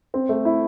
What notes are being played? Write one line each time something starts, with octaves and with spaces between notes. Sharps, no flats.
C4
A3
E4